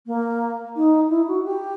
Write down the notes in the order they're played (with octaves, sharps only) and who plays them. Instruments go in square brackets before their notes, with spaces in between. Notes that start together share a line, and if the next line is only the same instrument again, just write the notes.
[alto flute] A#3
D#4
E4
F#4
G4